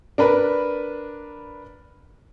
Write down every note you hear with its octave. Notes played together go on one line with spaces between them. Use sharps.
D4 A#4 B4 B5